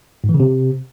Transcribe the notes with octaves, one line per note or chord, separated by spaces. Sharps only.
G#2
E3
C#3
C3